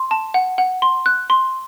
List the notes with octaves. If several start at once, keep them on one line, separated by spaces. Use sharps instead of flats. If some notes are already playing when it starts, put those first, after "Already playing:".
Already playing: C6
A5
F#5
F#5
C6
F#6
C6